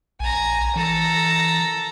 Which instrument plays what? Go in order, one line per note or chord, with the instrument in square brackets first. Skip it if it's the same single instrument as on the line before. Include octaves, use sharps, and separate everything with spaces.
[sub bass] A#1 [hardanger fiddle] G#5 A#5
[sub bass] E3 [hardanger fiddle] A4 A#5